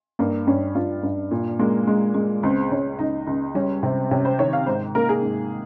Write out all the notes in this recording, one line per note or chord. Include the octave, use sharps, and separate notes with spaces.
G2 A#3
G2 C#4
G2 F4
G2
A#2
G#3 A#3
G#3
G#3
C#2 C4
C#2 C#4
C#2 D#4
C#2
G3 C#4
C3 C4
C3 C#4
C5
D#3 C#5
F5
G#2 C5
A#3 A#4
G#4
G#2